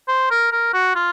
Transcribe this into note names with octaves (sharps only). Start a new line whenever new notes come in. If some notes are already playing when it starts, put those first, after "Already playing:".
C5
A#4
A#4
F#4
F4